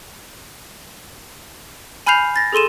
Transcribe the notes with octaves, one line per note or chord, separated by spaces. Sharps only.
G#5 B5 F6 G6 C7 F7
A6 A#6
G#4 A4 C6 D#7 E7